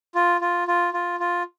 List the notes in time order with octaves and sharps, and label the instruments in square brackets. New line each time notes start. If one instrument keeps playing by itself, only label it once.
[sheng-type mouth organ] F4
F4
F4
F4
F4